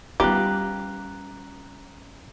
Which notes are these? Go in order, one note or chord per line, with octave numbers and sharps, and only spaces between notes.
G3 B3 C#4 F4 G4 A#5 F#6